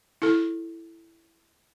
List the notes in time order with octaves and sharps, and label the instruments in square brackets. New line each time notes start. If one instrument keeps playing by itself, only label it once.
[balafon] E4 A4